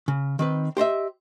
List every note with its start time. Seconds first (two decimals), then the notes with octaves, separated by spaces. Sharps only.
0.08 C#3
0.39 D#3 C4 B4
0.77 G4 C5 D#5 E5